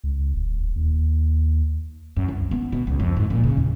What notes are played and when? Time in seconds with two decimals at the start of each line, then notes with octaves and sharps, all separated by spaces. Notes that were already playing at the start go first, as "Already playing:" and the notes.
0.04 C#2
0.34 D#1
0.76 D#2
2.16 F#2
2.28 C2
2.51 B3
2.72 B2
2.87 C#2
3.00 F2
3.17 G#2
3.30 A#2
3.44 C#3
3.57 E2